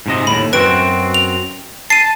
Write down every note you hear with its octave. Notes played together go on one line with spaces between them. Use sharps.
G#2 C3 D#5
D#2 A2 B5
F#2 C4 F#4 B4 D7
F7
A5 C7 D#7